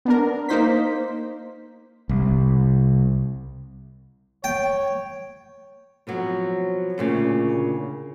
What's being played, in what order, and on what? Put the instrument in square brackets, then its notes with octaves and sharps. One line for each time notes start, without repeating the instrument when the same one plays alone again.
[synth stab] B3 D4 A#4
A#3 D#4 C5 B6
[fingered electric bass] C2
[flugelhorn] C#5 [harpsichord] G5
[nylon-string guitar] B2 F3 F#3 C4
D2 A#2 C#3